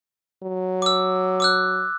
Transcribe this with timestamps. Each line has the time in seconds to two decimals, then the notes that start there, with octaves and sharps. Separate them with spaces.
0.43 F#3
0.82 D6 E6
1.40 D6 E6 F#6